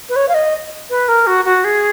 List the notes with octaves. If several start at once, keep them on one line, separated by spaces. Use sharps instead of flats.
B4
C#5
F5
D#5
B4
A#4
F#4
F#4
G#4